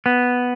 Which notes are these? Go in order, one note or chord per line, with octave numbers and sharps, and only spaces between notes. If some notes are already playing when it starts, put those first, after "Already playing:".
B3